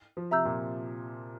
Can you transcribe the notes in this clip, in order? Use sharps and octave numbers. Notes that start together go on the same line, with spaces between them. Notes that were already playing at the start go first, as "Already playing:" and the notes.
F3
C3 E5 A#5 E6 G6
A#2